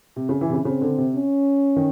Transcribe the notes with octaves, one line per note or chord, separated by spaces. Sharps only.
C3
C#3
E3
C3
C#3
C#3 C4
D3
C3
C#4
D#3